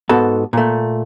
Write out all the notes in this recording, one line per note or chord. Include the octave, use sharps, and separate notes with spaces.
G#2 B3 F#4 A4 A5
A#2 A3